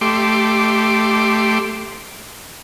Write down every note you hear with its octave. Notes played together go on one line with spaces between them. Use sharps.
A3 G4 C6 D6